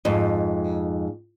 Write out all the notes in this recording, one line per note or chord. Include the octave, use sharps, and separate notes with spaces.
F2 G#2